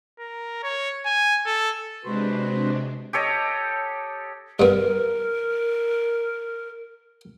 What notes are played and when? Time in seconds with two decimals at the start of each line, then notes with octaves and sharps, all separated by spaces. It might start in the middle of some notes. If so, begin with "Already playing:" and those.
0.19 A#4
0.63 C#5
1.05 G#5
1.46 A4
2.04 C3 G#3 D4 F#4 B4 C5
3.13 G4 A4 C#5 D#5
4.60 G2 B3 A#4